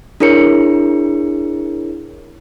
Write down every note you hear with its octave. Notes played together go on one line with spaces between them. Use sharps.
D4 E4 G#4 A#4 C#5 C#7